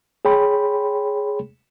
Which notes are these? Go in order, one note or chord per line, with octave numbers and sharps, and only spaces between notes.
G#4 C#5 G5 B5 C6